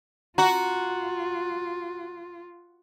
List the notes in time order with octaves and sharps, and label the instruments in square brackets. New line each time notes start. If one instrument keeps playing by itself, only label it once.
[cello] F4 [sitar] F#4 [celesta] A#5